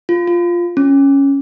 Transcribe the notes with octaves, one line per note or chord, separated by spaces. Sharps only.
F4
F4
C#4